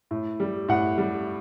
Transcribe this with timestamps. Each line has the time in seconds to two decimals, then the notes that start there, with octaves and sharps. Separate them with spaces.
0.11 A2
0.40 G3
0.68 A2 F#5
0.98 G3